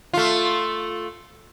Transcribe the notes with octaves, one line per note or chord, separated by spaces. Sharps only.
A3 F4